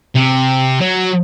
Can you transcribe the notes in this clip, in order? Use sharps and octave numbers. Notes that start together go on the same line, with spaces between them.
C3
F#3